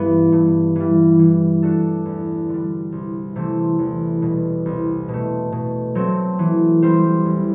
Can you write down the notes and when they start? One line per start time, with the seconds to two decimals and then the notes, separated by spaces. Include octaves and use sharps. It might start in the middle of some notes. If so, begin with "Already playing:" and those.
Already playing: G2 E3 B3
0.32 G2
0.76 E3 G3
1.19 E3
1.62 A3 D4 F#4 A4
2.05 E2
2.49 D3 G3
2.92 C2
3.36 C3 E3 A3 C4
3.79 E2
4.22 B2 G3
4.66 C2
5.09 B2
5.14 A3
5.52 B2
5.95 F#3 A3 C4
6.39 E3
6.82 G3 C4 G4 C5
7.25 E2